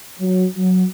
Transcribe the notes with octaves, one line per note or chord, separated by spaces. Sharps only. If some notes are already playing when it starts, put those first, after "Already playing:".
F#3
F#3